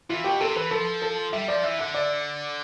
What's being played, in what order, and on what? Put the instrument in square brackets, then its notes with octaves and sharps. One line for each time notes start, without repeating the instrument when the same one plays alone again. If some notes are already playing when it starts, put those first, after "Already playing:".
[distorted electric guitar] E3 [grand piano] F4
[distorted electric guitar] B2 [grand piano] G4
[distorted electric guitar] C3 [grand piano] A4
[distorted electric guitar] E3 [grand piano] B4
[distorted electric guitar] F3 [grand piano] A4
[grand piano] A4
[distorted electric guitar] G3 [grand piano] E5
[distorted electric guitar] F3 [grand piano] D5
[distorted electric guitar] E3 [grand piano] E5
[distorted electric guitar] D3 [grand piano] E5
[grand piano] D5